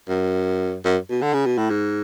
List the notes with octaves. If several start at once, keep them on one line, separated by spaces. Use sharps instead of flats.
F#2
F#2
B2
D3
C#3
B2
A2
G#2